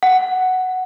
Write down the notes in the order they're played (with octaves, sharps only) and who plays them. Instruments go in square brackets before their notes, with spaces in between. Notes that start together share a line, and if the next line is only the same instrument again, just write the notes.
[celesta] F#5